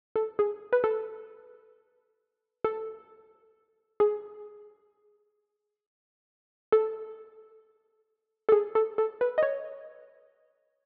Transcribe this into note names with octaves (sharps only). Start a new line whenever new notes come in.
A4
G#4
B4
A4
A4
G#4
A4
A4
G#4
A4
A4
B4
D#5
C#5